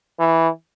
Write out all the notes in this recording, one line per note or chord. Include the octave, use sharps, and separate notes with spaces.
E3